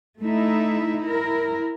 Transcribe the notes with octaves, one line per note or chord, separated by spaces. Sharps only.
A3 D#4 E4 E5
E4 A#4